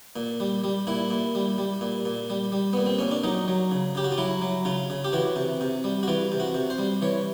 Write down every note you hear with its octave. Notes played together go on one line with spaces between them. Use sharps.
A#2
G3
G3
A#2 E4
A#2
G3
G3
A#2
A#2
G3
G3
A#2 B3
C4
A#2 C#4
D4
F#3 D#4
F#3
C#3
C#3 G4
F#4
F4
F#3 E4
F#3
C#3 F4
C#3
G4
E3 F#4
C3
C3
G3
F#4
E3 F4
C3
F#4
C3
C5
G3
E3 C#5